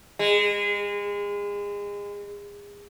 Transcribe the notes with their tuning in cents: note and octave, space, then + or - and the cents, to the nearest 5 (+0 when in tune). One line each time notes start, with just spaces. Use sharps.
G#3 -30